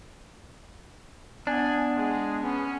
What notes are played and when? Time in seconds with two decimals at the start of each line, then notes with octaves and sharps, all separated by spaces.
1.47 B3 D4 G#5
1.96 G#3 G#4
2.43 B3 C#4